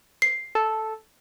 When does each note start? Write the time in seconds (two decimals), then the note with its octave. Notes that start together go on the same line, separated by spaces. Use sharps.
0.22 C7
0.55 A4